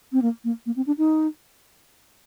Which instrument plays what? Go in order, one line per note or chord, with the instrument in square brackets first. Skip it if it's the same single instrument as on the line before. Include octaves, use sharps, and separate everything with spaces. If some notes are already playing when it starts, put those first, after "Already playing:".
[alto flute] C4
A#3
A#3
A#3
C4
D4
D#4